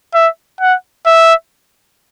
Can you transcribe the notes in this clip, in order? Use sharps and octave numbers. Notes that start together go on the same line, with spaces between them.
E5
F#5
E5